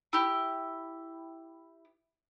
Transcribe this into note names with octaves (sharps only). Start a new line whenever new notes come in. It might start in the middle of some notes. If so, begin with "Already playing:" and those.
E4 G4